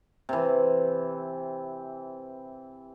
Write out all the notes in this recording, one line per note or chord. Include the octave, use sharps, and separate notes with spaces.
C3 E3